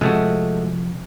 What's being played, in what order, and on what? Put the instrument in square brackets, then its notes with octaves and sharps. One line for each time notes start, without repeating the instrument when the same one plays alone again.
[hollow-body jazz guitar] C3 F3 [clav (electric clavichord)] G#3 A3 F#4